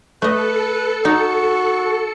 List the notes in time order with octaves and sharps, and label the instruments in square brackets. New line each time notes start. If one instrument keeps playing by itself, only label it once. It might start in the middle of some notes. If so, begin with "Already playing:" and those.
[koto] A3 D#5 [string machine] A4 C#7 [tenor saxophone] B4
[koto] D#4 [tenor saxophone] F#4